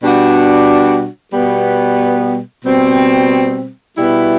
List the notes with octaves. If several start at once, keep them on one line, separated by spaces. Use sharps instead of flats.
B2 G3 D4 F#4
B2 G3 B3
B2 G3 C4
B2 G3 B3 E4